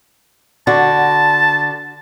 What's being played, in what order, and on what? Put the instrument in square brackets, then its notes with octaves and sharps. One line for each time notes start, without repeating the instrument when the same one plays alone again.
[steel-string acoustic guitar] D3 F#4 [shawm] A5